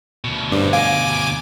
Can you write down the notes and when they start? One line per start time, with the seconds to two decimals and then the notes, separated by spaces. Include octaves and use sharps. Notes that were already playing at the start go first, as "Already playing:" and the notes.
0.25 D2 B2
0.52 G2 D4 G4 C5
0.73 D#5 F5 G#5 D6